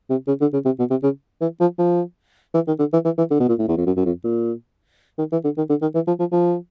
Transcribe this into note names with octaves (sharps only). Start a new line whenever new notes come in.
C3
C#3
D3
C#3
C3
B2
C3
C#3
E3
F3
F3
E3
D#3
D3
E3
E3
E3
D3
B2
A#2
A2
E2
F2
F#2
F#2
F2
A#2
D#3
E3
D3
D#3
D3
D#3
E3
F3
F3
F3